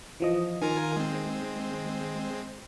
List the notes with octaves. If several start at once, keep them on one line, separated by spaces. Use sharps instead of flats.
E3 F3 D#5
D#3 F4 A#4 G#5
G#3 C4